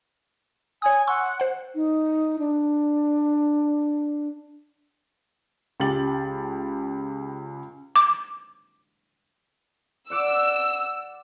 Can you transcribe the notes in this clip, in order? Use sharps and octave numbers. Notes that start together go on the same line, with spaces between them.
C#5 G#5 D#6
F#5 C6 C#6 E6
C5 F#5
D#4
D4
C#2 G4 A6 F#7
D6
D5 F#5 D6 E6